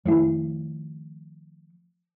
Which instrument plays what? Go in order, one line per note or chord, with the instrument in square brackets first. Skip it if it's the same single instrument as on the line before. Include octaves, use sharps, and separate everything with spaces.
[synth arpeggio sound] F2 E4 [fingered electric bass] D#3 F3 A3